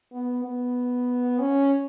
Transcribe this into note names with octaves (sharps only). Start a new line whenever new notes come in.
B3
B3
C#4